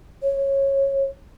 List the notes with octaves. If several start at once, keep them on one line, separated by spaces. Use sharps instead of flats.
C#5